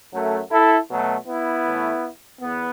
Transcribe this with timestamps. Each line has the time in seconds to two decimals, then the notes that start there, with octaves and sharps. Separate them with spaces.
0.13 F#2 F#3 A3
0.51 E4 A4
0.89 B2 F#3 A3
1.27 B3 E4
1.66 A2 E3 A3
2.41 E2 B3